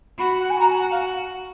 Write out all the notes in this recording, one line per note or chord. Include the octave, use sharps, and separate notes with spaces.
F#4 B5
F#5
G#5
F#4 A#5
G#5
F#5
F5